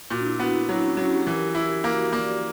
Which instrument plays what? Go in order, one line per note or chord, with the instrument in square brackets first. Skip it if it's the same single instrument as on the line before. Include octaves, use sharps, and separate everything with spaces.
[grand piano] A#2 [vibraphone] F#4
[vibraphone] D4
E4
[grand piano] B3 [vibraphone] F#4
[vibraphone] E4
[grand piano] F#3 [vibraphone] D4
[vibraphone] C#4
[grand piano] F#3 [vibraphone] C#4
[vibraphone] G4
G4
[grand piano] E3 [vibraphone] A#4
[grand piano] E4
[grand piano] A#3 [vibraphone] F#4
[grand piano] A#3 [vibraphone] D5